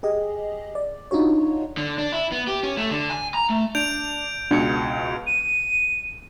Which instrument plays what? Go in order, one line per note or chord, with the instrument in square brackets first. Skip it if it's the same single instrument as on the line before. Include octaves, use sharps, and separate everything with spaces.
[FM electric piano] G4 G#4 D#5
D5
D4 D#4 F4 F#4 C#5
[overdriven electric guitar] D3
D4
E4
B3
G4
C#4
A3
D3
G#5
A#5
A3
[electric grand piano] D4 [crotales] G6 D7 F7
[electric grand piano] C#2 B2 C#7 [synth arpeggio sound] D4
[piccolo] D#7